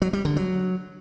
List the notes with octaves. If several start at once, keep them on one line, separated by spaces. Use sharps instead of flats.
F#3
G3
D3
F#3